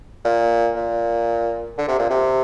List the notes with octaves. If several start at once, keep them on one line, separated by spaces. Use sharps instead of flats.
A#2
A#2
D3
C3
A#2
C3